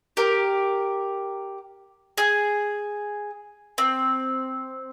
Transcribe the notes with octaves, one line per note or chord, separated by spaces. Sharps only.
G4 A#4
G#4
C4